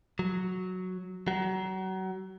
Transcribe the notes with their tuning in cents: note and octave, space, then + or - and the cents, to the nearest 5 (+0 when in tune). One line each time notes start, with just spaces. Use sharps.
F#3 -5
F#3 +30